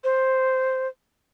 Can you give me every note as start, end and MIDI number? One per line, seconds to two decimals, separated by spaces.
0.04 0.88 72